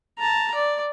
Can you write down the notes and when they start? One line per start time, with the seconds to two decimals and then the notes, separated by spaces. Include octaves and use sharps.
0.19 A5 A#5
0.54 D5